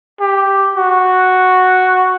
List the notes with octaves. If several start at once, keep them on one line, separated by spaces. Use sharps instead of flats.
G4
F#4